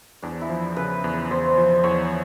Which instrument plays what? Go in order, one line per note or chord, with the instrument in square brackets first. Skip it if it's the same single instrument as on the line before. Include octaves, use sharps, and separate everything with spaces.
[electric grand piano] E2 [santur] D4
[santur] E4
[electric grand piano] F3
[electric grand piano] C#3 [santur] B4
[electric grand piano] E2
[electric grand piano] E2 [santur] C5
[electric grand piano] F3
[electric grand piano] E2 [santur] C#5